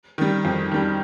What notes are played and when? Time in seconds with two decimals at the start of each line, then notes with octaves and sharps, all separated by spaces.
0.18 D#3 G3
0.45 F2
0.72 D#3 G3